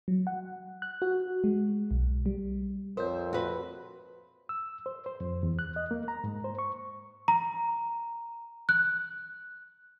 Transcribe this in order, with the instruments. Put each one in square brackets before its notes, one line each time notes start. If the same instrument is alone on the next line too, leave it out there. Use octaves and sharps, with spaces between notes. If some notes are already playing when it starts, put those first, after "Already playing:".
[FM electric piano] F#3
F#5
F#6
F#4
G#3
B1
G3
[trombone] F2 [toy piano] A#4 C#5 [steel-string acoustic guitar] C5 E5
[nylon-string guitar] F#4 B4
[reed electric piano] E6
C5
C5
F2
E2
F#6
D#5
A#3
A#5
G#2
C5
C#6
[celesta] A#5
F#6